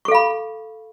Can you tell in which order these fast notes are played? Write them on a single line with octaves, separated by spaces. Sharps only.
C#6 A4 F5 B5